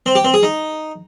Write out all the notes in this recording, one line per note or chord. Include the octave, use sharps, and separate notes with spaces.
C4
G4
C4
G#4
D#4